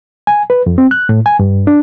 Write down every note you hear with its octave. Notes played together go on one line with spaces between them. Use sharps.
G#5
B4
F2
C4
F#6
A2
G#5
G2
D4